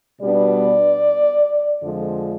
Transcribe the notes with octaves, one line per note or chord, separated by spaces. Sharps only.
B2 G3 B3 D4 D5
F2 D3 F3 G#3